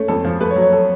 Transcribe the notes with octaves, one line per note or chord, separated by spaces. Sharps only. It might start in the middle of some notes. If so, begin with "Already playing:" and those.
Already playing: A3 C#4
F2 A4
F3
A3 B4
C#5
F#3
C#5
A4